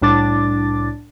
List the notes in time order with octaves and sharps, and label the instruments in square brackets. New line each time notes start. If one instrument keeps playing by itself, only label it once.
[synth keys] C2 A2 D4 D6 A6